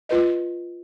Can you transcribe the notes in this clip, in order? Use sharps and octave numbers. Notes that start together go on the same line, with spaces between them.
F4 B4 D#5